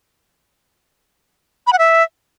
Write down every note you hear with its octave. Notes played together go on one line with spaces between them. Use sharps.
B5
F#5
E5